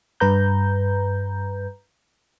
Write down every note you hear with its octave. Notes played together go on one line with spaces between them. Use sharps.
G2 B4 A#5 G6